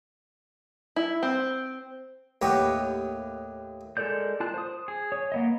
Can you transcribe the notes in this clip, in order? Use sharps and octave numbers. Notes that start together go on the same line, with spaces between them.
E4
C4
D#2 A2 G4 B4 C#5 F#5
G#3 A4 A#4 D5 G6
F4 A5 F#6
C5 D#6
G#4
C#5
A#3 B3 D#5